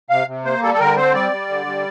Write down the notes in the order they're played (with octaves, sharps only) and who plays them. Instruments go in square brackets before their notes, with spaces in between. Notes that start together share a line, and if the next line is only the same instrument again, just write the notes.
[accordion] C3 F5
C3
A#3 C5
G3 A4
A4
D3 A#4
C4 C5
G3 D5
G3
D3
G3